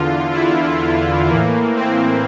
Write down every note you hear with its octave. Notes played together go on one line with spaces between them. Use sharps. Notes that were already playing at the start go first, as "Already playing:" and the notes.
Already playing: E2 D3 F4
E4
A2 E3 A#3
C4